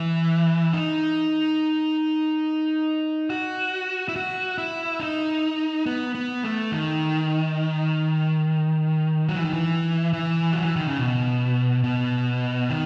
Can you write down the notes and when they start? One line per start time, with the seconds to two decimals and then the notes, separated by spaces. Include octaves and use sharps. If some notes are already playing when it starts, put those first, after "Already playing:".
Already playing: E3
0.74 D#4
3.30 F#4
4.08 E4
4.16 F#4
4.58 E4
5.00 D#4
5.86 B3
6.15 B3
6.43 A3
6.72 D#3
9.29 F#3
9.36 E3
9.45 D#3
9.53 E3
10.13 E3
10.53 F#3
10.64 E3
10.76 D#3
10.88 C#3
10.98 B2
11.84 B2
12.70 D#3